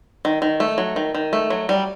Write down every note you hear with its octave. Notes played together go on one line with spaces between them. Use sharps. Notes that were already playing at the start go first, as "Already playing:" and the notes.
D#3
D#3
A3
F#3
D#3
D#3
A3
F#3
G3